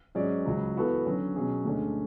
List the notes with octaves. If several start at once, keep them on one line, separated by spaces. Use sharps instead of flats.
G#2 F#3 C#4 G#4 D5
C#2 C#3 F#3
E3 B3 F#4 A4
D3 F#3 C#4
B2 F#3 C#4 G#4
D2 D3 G#3 C#4